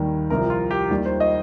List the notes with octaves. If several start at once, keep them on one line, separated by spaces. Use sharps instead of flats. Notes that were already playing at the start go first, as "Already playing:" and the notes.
Already playing: D#2 D#3 G3
C2 C3 F3 A#4
F4
G4
D#2 D#3 G3
C5
D#5